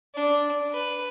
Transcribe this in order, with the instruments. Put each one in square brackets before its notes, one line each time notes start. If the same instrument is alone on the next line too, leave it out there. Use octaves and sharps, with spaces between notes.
[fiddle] D4
B4